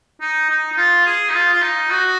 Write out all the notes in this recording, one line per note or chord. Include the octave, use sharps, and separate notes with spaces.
D#4
D#4
D#4
F4
G#4
D#4
F4
F4
D#4
F#4